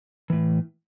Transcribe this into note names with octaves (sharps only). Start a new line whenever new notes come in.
A2 E3